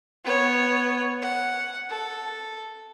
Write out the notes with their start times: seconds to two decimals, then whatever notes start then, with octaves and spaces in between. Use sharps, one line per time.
0.24 B3 C#5
1.21 F#5
1.89 A4